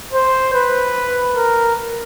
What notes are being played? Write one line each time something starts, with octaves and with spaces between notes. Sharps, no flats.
C5
B4
A#4